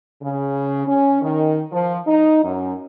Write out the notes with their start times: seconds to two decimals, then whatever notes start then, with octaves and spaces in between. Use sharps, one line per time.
0.22 C#3
0.87 C#4
1.22 D#3
1.72 F3
2.07 D#4
2.44 F#2